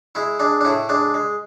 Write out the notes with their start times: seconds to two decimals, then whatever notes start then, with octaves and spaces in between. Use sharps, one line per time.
0.15 G#3 E4
0.40 G#3 D4
0.61 D4
0.65 A2 E4
0.89 G#3 D4
1.14 G#3